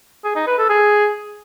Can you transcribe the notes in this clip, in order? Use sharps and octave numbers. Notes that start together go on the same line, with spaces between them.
G#4
D#4
B4
A4
G#4